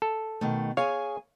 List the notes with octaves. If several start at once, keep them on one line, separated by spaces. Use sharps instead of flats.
A4
B2 D#3 A3
G#4 C#5 F5 G#5